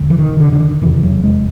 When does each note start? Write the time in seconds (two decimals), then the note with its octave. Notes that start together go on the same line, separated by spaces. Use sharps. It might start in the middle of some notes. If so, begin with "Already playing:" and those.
Already playing: E1 D3
0.10 E3
0.19 D#3
0.40 D3
0.53 D3
0.61 D#3
0.82 F1 E2 C#3 E3
1.03 F#3
1.24 G#3